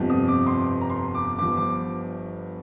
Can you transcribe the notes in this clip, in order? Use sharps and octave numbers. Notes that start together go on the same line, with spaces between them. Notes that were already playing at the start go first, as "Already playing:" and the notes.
Already playing: G1 F2 C3 F3
D#6
D6
C6
A#5
C6
D6
G1 G2 F3 D6
D6